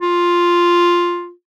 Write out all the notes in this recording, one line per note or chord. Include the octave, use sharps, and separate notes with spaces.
F4